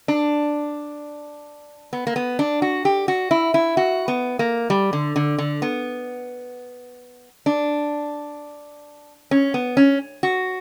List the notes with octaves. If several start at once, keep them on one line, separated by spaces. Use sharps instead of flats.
D4
B3
A#3
B3
D4
F#4
G4
F#4
E4
E4
F#4
B3
A#3
G3
D3
D3
D3
B3
D4
C#4
B3
C#4
F#4